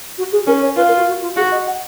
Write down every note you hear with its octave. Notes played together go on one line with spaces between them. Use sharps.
F#4
G#4
C#4 A#4
C#5
F4 B4
A#4
F#4
F#4
F4
F#4 G#4
D#5
F#5